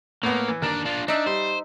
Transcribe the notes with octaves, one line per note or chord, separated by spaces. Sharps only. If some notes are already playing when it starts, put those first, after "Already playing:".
A2 A#3 B3
E3
D#2 D4 A#4 D5
D4 F4
D4 D#4 E5
G3 C5